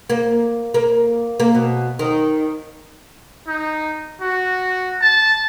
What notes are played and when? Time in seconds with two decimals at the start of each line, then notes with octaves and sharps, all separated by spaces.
0.10 A#3
0.74 A#3
1.40 A#3
1.54 B2
1.99 D#3
3.47 D#4
4.21 F#4
5.01 A5